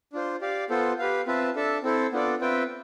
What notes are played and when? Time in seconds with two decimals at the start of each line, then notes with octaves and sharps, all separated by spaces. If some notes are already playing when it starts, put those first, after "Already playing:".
0.13 D4 F4 C5
0.41 G4 D5 F5
0.70 B3 F4 A4 C5
0.99 G4 B4 F5
1.26 C4 F4 B4 E5 A5
1.56 D4 A4 E5 A5
1.83 C4 E4 A4 C5
2.12 B3 D4 F4 A4 D5
2.40 C4 F4 B4 E5 G5